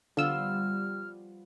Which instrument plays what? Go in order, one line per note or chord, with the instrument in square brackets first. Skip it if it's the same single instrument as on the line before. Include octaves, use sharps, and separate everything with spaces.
[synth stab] D3 E6 [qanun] F3 B3 F4 [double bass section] G3 [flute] F6